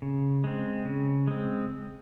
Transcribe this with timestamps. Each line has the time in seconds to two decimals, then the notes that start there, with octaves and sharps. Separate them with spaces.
0.02 C#3
0.44 G#3 C4
0.85 C#3
1.28 G#3 C4